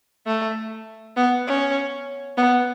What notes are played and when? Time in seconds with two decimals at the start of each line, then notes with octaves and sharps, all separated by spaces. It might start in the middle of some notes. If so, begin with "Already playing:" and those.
0.26 A3
1.17 B3
1.47 C#4
2.37 B3